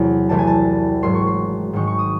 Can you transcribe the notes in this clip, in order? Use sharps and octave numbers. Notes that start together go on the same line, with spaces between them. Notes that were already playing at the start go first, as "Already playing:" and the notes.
Already playing: E2 C3 F#3 A3 C4
C2 C3 E3 A3 C4 A5
G#5
A5
G#1 G#2 F#3 C6
C#6
C6
G#2 D#3 G#3 D#4 C#6
C#6
D#6